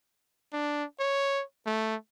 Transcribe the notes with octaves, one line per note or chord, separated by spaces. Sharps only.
D4
C#5
A3